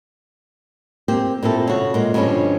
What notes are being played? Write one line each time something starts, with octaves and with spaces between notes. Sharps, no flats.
A#3 C4 G4
A#2 C4 E4 A4
C#3 F#4
A#2 G#3
G2 B2 D3 F3 C#4